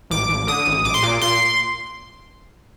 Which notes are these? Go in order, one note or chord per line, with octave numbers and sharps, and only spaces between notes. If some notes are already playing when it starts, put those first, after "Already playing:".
A1 D6
A1
D3 D#6
A1
A#1 D6
C6
A#2 D6
A#2 C6